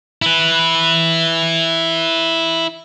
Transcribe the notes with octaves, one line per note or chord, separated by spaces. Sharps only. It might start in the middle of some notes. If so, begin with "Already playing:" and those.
E4 B4